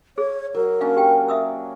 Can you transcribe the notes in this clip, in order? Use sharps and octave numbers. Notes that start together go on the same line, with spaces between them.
G#4 C#5
F#3 A#4
A#3 C#4 D4 F5
G4 G5
E5 D#6 E6